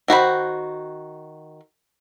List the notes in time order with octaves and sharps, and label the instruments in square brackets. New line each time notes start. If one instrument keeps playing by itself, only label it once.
[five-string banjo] D#3 F#4 C5 B5